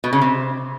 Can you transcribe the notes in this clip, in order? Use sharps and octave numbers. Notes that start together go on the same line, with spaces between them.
B2
C#3
C3